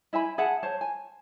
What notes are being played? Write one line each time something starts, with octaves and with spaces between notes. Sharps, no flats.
E4 E5 G#5 B5
G#4 E5 F#5 A5
C5 C#5 A5
G#5